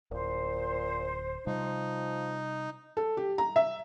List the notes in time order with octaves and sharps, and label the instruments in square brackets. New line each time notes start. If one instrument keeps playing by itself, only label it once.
[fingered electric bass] D1 [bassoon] A#2 [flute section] C5
[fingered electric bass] C3 G3 [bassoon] F3 [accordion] D#4
[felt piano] A4
G4
A#5
E5